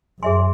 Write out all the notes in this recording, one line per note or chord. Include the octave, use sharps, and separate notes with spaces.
F#2 G#4 C#5 E5 G#5 C6